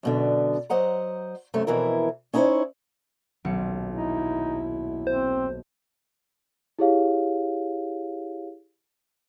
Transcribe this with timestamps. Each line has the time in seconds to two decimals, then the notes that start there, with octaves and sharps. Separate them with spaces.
0.03 F#2 B2 D3
0.70 F#3 C5 D#5 F#5 A#5
1.54 F#2 C3 A3 A4
1.67 F2 B2 E3 E4 A#4
2.33 C#4 D#4 E4 G4 C5 C#5
3.45 D#1 B1 C#7
3.95 D#4 E4
5.07 C4 C5
6.79 E4 G4 G#4 C#5 F5